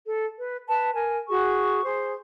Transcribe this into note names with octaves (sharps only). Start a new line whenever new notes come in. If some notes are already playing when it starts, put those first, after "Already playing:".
A4
B4
B4 A5
A#4 G#5
F#4 G#4 C#6
G#4 C5